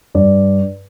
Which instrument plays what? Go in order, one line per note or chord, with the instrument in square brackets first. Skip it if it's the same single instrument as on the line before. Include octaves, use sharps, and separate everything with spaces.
[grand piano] G2 D5